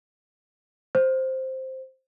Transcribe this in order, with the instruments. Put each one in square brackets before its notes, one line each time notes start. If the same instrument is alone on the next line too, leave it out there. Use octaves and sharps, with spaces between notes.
[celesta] C5